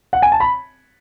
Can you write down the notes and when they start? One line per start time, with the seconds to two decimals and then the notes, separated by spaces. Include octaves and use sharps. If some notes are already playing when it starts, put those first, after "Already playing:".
0.13 F#5
0.22 G#5
0.32 A5
0.40 B5